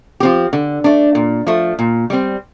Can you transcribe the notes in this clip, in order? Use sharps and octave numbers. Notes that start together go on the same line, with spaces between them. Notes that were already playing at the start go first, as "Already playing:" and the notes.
F3 C4 G4
D3
A3 D4
A#2
F3 A3
A#2
G3 C4